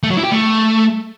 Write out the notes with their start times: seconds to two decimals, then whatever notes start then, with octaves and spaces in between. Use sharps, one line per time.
0.03 A3
0.10 F#3
0.17 E4
0.24 G4
0.31 A3